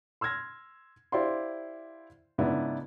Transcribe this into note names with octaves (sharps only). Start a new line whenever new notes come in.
C6 E6 F6 G#6 A#6
E4 G4 C5 D5 F5 C6
G#2 C#3 B3 D4 E4